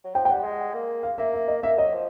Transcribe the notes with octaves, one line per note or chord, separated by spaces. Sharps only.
F#3
F3 G5
G5
G3 F#5
G#3
A#3
F5
A#3 E5
E5
D#5
A#3 E5
F#3 D#5
F3